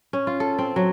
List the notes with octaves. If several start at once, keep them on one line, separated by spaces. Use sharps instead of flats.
C#4
F4
A4
C4
F#3